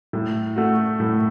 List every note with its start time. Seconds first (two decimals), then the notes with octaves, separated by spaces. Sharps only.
0.13 A2
0.56 A3 F#4
1.00 A2